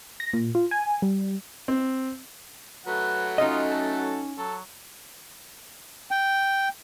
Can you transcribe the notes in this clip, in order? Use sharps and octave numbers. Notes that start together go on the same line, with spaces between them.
A#6
A#2
F4
G#5
G3
C4
F#3 A3 B4 F#5
C#4 D#4 F4 D#5
A4
F#3 A4
G5